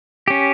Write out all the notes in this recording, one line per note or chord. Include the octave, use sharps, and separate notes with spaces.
C#4 G4